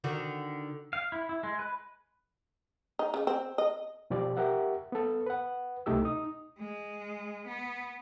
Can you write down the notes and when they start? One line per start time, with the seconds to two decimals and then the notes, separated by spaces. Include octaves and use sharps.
0.04 D3 D#3 F#4
0.93 F5
1.12 E4
1.29 E4
1.43 G#3
1.59 B4
2.99 D#4
3.14 C#3
3.27 C4
3.58 D#5
4.10 B2 F3 G4 D5
4.37 G4 A#4 E5 F#5
4.92 B3 A4
5.26 B4 F#5
5.86 C2 B2 A3 D#4 G4 E6
6.05 D#4 D#6
6.58 G#3
7.47 B3